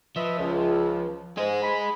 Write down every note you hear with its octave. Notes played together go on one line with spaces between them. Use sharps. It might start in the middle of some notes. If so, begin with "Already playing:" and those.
F3 B4 D#5 E5
C#2
G#2 G#4 D#5
B5